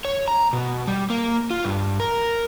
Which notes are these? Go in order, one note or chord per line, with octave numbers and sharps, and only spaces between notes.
C#5
A#5
B2
G3
A#3
F4
G2
A#4